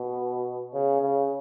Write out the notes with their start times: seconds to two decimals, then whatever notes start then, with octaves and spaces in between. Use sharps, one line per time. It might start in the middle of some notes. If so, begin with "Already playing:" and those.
Already playing: B2
0.74 C#3
1.02 C#3